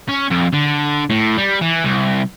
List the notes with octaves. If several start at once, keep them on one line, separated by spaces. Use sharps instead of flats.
C#4
F2
D3
A2
G3
E3
C2